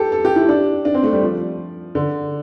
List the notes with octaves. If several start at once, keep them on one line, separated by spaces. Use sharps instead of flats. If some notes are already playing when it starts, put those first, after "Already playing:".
Already playing: G4 A4
A4
G4
E4
D4
D4
C4
A3
G3
F3
D3